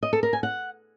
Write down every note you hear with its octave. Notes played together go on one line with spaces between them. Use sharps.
D#5
A4
A#4
G#5
F#5